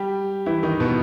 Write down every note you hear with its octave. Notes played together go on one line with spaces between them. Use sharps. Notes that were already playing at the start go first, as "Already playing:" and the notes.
Already playing: G3 G4
E3 E4
D#3 D#4
B2 B3